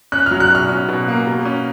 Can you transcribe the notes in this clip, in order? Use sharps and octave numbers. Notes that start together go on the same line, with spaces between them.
C#4 F#6
F#3 F6
F#6
B2 F6
C#4
B2
A#3
B2
C#4